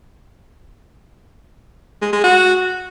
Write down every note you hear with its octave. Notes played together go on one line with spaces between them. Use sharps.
G#3
G#3
F#4